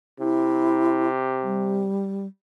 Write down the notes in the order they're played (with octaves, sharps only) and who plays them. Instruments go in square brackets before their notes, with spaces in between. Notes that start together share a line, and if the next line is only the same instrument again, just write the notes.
[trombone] C3 [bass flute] E4
[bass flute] G3